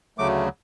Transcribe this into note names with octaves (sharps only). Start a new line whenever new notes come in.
D2 C#3 F#3 A3 D6